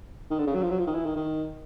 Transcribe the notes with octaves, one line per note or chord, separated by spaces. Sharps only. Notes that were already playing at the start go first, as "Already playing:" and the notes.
D#3
D3
C#3
F#3
F3
F#3
F3
D#3
E3
D#3
D#3